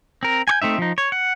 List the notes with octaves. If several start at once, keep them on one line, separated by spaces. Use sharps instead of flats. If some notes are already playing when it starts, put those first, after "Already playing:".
C4 A#4
G#5 C#6 G6
A3 C4 D#4 E5
F3 D#4
C#5
F#5